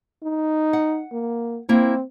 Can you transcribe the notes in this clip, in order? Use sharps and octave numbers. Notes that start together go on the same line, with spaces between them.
D#4
F#5
A#3
A#3 C4 E4